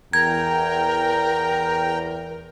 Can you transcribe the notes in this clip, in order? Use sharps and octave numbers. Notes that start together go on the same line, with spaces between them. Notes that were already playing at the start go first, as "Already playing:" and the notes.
E2 A#4 G5 A#5 G#6